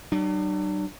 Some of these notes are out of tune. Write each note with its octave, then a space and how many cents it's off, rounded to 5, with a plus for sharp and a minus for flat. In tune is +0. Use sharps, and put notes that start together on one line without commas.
G3 -45 D4 +45